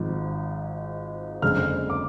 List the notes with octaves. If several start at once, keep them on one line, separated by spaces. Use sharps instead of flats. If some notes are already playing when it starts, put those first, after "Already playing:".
Already playing: G#1 G#2 F3
F#1 F2 D3 G#3 F6
D6